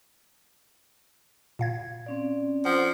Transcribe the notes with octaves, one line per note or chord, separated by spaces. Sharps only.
A#2 F5 G#6
C4 C#4 D5
F3 F#5